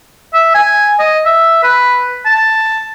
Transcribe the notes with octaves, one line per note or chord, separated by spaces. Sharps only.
E5
G#5
D#5
E5
B4
A5